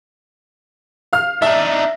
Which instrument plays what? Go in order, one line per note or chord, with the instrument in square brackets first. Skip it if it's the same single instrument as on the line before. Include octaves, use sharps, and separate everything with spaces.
[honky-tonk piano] F5 F6
[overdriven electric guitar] D4 D#4 [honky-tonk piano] E5